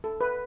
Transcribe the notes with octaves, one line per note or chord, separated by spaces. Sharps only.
A4
B4